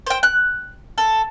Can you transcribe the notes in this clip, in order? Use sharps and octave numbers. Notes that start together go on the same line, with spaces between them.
C5 G5
F#6
A4